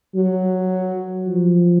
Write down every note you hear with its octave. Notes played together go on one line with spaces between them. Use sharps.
F#3
F3